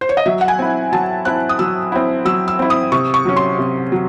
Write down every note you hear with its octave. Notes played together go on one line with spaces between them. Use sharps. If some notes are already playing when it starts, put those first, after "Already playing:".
C5
C#5
D#5
F#3 E5
F#5
G#5
C4 E4
F#3 A5
C4 E4 F#6
D#6
F#3 E6
C4 E4
F#3 E6
E6
C4 E4
D#6
C3 C#6
C#6
F#3 C#4
C6
C3
F#3